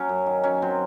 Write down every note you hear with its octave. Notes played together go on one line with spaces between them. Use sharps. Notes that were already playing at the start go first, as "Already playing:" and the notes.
Already playing: F#3 C#4
F#2
D#3
F#2 C#4
F#3 C4